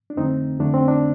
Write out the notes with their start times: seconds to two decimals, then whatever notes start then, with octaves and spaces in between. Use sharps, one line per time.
0.10 D4
0.17 F2 D3 A3 C4 D#4
0.59 F2 D3 A3 D4
0.74 C4
0.88 D4